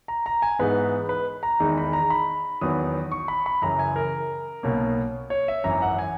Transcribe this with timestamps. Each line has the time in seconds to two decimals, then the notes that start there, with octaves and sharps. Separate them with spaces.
0.08 A#5
0.26 A#5
0.42 G#5
0.59 G#2 E3 G#3 B3 D#4 B4
1.09 B4
1.43 A#5
1.60 E2 D#3 G#3 D#4
1.78 B5
1.93 A#5
2.10 B5
2.61 E2 D#3 F#3 B3 D#6
3.11 C#6
3.28 B5
3.46 B5
3.62 F#2 C#3 E3 A#5
3.79 G#5
3.96 A#4
4.63 B1 B2 A#3 C#4
5.30 C#5
5.48 E5
5.64 G#1 F#2 E3 A#5
5.82 F#5
5.98 G#5